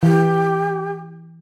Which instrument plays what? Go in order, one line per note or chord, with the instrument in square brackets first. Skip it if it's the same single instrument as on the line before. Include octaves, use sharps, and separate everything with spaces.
[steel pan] E3 [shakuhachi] G4